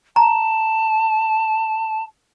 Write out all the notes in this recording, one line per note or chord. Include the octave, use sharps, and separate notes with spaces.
A5 A#5